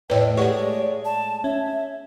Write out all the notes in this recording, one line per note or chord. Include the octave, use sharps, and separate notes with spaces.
E2 A2 B4 C#5 D#5 G5
G#3 A3 G4 C#5 D5 F#5
A5
C#4 E5